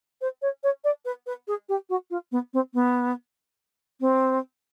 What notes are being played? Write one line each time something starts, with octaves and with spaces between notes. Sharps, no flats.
C5
C#5
C#5
D5
B4
B4
G#4
G4
F#4
F4
B3
C4
B3
C4